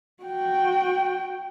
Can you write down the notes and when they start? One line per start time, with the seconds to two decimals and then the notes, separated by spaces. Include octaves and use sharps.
0.24 F#4 G5